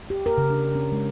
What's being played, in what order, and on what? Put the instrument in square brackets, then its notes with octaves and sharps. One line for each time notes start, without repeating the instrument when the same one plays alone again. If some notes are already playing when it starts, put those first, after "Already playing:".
[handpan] G4
A#4
C#3
D4
C#4
G#3